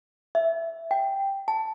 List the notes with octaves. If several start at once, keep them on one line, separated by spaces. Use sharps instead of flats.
E5
G5
A5